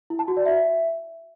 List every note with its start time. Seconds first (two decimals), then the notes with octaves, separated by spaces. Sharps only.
0.10 E4
0.19 A5
0.28 F#4
0.37 D5
0.46 E5